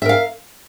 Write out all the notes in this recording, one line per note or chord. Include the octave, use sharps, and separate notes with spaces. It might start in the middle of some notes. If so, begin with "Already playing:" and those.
A#4 E5 F5